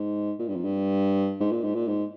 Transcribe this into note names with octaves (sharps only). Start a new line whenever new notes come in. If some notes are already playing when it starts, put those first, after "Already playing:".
Already playing: G#2
A#2
G2
F2
G2
G#2
A#2
G#2
A#2
G#2